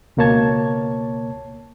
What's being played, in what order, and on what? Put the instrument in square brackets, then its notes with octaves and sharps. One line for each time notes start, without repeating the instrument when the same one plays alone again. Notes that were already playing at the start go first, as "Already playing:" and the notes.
[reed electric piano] C#2 B2 A#3 C#5 A5 G#6